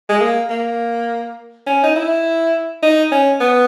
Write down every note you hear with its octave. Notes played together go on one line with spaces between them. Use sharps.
G#3
A#3
A#3
C#4
D#4
E4
D#4
C#4
B3